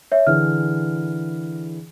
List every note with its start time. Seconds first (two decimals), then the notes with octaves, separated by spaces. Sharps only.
0.12 C#5 E5
0.27 D3 E3 G#4 F6